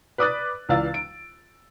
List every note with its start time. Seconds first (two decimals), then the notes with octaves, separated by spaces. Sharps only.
0.18 B4 D5 D6 D#6 F#6 A6
0.69 C#2 E3 D5 F5 E6 A6
0.94 D7